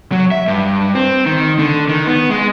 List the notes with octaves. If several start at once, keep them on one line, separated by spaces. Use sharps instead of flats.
F#3
E5
G2
C4
D#3
D3
D#3
B3
G#3